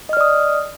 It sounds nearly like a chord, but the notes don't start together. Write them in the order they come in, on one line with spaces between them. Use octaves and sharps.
D#5 F6 D5 D#6